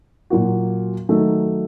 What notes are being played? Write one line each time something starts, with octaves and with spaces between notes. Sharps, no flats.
A#2 F#3 A#3 F#4
D#3 F#3 A3 D#4